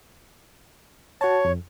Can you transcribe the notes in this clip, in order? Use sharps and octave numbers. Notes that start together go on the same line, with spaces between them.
F#4 C#5 A5
F2